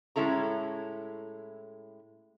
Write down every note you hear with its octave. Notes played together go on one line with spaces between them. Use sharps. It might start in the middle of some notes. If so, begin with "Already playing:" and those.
A2 G#3 C#4 E4 A4 A#5